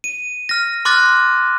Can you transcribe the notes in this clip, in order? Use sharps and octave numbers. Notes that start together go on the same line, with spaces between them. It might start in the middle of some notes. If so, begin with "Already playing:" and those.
D#7
F6 A#6
C6 D6 F6 F#6 A6 A#6